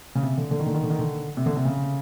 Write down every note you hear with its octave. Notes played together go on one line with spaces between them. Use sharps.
C#3
C3
D3
D3
D#3
D3
D#3
D3
D#3
D3
C3
D3
C3
C#3